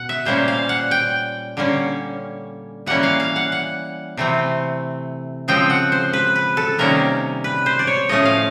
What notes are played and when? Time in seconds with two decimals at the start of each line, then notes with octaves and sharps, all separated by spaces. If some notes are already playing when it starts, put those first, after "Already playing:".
Already playing: B2 F#5
0.09 E5
0.25 A#2 G3 A#3 C#4 C5
0.48 F5
0.69 F#5
0.91 G5
1.57 D3 G3 A#3 C#4
2.86 E3 G3 A#3 C#4 F#5
3.03 F5
3.20 F5
3.36 F#5
3.52 F#5
4.17 C3 E3 A3 C4
5.48 C#3 F3 G#3 C4 G5
5.70 F#5
5.92 C5
6.13 B4
6.36 B4
6.57 A4
6.78 C3 D#3 G3 A#3 C#4 A#4
7.44 B4
7.66 C5
7.79 D5
7.87 C#5
8.09 A2 F3 A3 C#4 D#5
8.25 F5